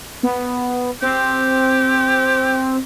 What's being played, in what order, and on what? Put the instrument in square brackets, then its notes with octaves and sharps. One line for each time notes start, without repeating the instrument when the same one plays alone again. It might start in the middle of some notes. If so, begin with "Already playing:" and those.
[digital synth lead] B3
[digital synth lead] C4 [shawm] G4